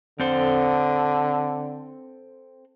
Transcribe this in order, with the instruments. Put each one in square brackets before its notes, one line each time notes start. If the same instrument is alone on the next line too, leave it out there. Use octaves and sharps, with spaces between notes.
[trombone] D3 [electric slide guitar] C4 A4 C5